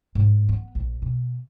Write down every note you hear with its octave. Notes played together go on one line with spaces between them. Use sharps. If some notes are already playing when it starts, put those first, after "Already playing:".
G#2
B3
A#1
B2